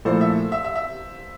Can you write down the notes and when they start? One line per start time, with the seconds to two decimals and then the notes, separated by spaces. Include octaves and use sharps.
0.05 A#2 F3 A3 E4 A4 C5
0.21 E5
0.52 E5
0.64 E5
0.76 E5